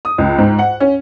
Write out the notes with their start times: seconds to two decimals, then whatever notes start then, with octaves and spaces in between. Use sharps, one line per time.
0.05 D#6
0.18 C#2
0.38 G#2
0.59 F#5
0.80 C#4